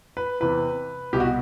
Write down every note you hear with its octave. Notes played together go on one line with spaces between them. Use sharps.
B4
E2 C3 E3 B4
C2 B2 G4
F#4